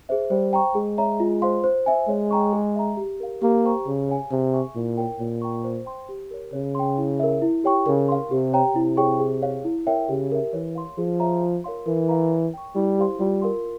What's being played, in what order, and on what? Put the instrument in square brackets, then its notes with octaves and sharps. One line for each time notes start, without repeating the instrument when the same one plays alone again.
[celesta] G#4 C5 E5
[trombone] G3 [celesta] C5
[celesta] G5 A#5 C#6
[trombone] G#3 [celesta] G#4
[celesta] C#5 E5 A#5
F4
C5 F5 C6
C5
E5 G#5
[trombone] G#3 [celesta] C#5
[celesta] G5 A#5 C#6
G#4
E5 A#5
G4
A#4 F5
[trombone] A#3 [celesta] G4
[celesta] C5 G5 A#5 C#6
[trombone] C#3 [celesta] G#4
[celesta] C#5 F5 G#5
[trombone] C3 [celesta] G#4
[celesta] E5 G#5 C#6
[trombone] A#2 [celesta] E4
[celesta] A#4 C#5 G5
[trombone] A#2 [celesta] C#5
[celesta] G5 A#5 C#6
C5
G5 C6
G4
A#4 C#5
[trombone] C#3 [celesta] C#5
[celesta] G5 C6
E4
A#4 E5
E4
G4 C#5 G5 C#6
[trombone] C#3 [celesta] A#4
[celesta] F5 C6
[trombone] C3 [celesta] G4
[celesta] C#5 G5 A#5
[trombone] C3 [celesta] E4
[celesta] G#4 C#5 G5 C#6
G#4
C#5 F5
E4
A#4 C#5 E5 G5
[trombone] C#3 [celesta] G4
[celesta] A#4 E5
[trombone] E3 [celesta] C#5
[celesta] F5 C6
[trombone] F3 [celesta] G#4
[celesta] C#5 E5 A#5
F4
A#4 C#5 F5 C6
[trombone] E3 [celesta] A#4
[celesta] F5 A#5
C#5
G5 C#6
[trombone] G3 [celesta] E4
[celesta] G4 C5 F5 C6
[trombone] G3 [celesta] F4
[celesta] A#4 F5 C6